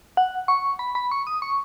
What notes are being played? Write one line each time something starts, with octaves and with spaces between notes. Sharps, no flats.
F#5
C#6
B5
B5
C#6
D#6
C#6